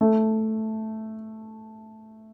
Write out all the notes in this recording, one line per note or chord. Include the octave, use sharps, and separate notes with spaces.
A3